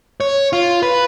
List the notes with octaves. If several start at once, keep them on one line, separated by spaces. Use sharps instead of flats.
C#5
F4
B4